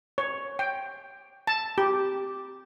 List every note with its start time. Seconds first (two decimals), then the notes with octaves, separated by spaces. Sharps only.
0.18 C#5
0.59 G5
1.47 A5
1.78 G4